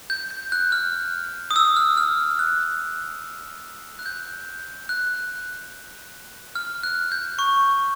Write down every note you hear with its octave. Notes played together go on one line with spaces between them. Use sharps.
G6
G6
F#6
F6
D#6
E6
F6
F6
F#6
F#6
G6
F#6
F6
F#6
G6
C#6